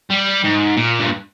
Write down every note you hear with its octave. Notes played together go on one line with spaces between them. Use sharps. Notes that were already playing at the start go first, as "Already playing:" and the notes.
G3
G#2
A#2
G2